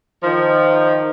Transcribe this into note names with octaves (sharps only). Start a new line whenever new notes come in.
D#3 F3